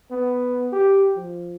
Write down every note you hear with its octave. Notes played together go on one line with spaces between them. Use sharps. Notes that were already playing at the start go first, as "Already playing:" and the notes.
B3
G4
F3